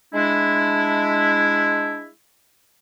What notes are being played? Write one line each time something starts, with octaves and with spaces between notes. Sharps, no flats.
G#3 D4 E4